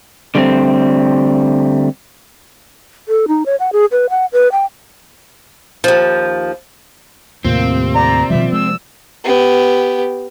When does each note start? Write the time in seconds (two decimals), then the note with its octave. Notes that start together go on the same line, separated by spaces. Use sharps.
0.35 D3 G3 A3 A#3 C4
3.08 A4
3.28 D#4
3.46 C#5
3.60 F#5
3.72 G#4
3.92 B4
4.10 F#5
4.32 B4
4.52 G5
5.84 D#2 F3
7.45 D#2 A2 C3 A#3 C4 F4
7.95 D5 A#5
8.30 B2 D#3 F3 G3 E5
8.53 G#3 E6
9.24 B3 G4